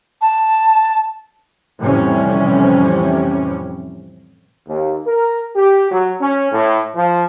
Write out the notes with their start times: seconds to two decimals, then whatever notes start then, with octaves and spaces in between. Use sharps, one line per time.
0.22 A5
1.80 F2 A2 C3 E3 G3 C#4
4.67 D#2
5.05 A#4
5.55 G4
5.91 F#3
6.20 C#4
6.52 A2
6.96 F3